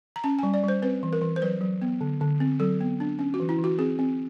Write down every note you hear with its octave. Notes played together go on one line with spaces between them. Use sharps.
A#5
C#4 A5
G3 G#5
D5
G3 C5
C4 B4
E3
A#4
E3
C5
F#3 B4
F#3
B3
D3
D3
C4
F#3 A4
B3
D4
C#4
F#4
E3
E4
E3
F#4
C4 G#4
C4